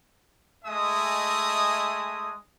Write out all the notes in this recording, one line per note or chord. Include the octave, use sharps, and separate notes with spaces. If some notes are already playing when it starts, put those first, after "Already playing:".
G#3 A3 D#5 E5 G#5 D#6